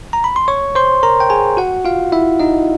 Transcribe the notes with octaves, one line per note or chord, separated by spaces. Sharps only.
A#5
B5
C6
C#5 C#6
C5 C6
A#4 A#5
G5
G#4 G#5
F#4 F#5
F4 F5
E4 E5
D#4 D#5